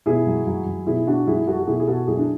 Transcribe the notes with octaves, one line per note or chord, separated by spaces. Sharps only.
B2 E4 G#4
F#3
F#3
F#3
B2 E4 G#4
B2 D4 F#4
F#3 E4 G#4
F#3 F#4 A4
F#4
B2 E4 G#4
G#4
B2 F#4 A4
F#3 E4 G#4
D4